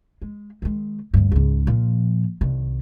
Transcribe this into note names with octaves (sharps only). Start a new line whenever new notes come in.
G#3
D#3 G#3
D2 G2
C#2 G#2
A#2 F3
C2 D#3